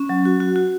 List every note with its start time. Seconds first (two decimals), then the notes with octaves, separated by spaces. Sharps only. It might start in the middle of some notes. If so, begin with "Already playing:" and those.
Already playing: C#4
0.09 F#3
0.25 F#4
0.40 F#4
0.56 F#4